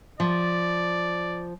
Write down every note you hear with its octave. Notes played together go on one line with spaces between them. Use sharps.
F3 D5